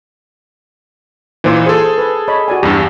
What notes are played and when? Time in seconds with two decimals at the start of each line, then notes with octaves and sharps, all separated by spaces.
1.44 A#2 E3 D#4 C5
1.66 G#4 A4 C5
1.98 B4
2.28 C#5 D#5 B5
2.48 F#4 D5 G#5
2.63 E2 G2 D4 G4